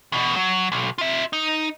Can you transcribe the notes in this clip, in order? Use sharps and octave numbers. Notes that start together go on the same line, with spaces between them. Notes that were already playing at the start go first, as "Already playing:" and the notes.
E2 B2
F#3
B1
F4 E5
D#4